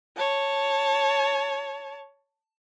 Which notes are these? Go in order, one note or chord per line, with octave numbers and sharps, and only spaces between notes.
C#5 A5